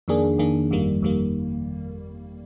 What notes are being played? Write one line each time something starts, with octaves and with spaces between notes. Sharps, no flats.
F2 D#3 A#3 D4 G#4
F2 D#3 A#3 D4 G#4
G1 F2 D#3 G3 A#3
G1 F2 D#3 G3 A#3